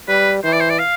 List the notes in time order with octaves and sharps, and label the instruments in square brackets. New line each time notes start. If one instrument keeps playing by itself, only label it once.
[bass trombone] G3 [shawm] B4
[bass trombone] E3 [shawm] C5
[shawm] D5
C5
D5
F5